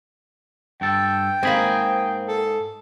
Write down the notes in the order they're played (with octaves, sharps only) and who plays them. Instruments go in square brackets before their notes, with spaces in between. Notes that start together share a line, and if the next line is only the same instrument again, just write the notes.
[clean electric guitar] G2 A4 [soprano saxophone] G5
[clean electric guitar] G#2 G#4 B5 [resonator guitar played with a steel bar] A#3 C4
[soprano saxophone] A4